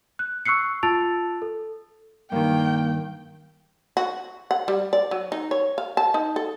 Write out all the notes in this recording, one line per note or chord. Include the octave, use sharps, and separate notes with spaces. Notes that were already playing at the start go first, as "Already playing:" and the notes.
F#6
C#6 E6 F#6 C7 C#7
F4 A5 E6 A6 D7 F7
A4
G2 D#3 A#3 G5
F#4
F#5
G3
D5
F#3
D#4
C#5
F5
A5
D#4
A4